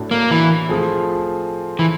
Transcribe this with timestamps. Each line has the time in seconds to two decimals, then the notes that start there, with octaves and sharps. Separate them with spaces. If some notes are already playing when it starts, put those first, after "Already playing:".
Already playing: A2 F#3 A3 D4
0.11 A#3
0.31 E3
0.69 F3 A3 C4 F4 G#4
1.79 E3